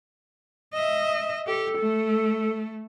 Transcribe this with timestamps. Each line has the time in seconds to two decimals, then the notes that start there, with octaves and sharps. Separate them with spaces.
0.74 D#5 E5
1.47 G4 A4
1.78 A3